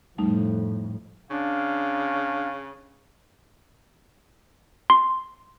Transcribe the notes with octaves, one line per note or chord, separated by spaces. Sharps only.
F2 A2 G3 A3 D#4
C#3 D4 F5
C6